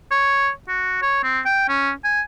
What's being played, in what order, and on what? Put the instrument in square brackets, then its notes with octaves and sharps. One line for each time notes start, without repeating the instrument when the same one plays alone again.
[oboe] C#5
F#4
C#5
C4
G5
C#4
G#5